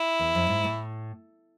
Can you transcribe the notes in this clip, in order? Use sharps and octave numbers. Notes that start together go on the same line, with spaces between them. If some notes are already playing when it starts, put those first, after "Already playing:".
Already playing: E4
E2
F2
G#2
A2